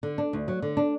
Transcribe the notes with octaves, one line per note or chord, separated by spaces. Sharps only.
D3
D4
D2
F#3
D3
D4